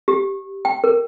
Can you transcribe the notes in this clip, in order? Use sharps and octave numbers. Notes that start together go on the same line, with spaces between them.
G4
G5
A#4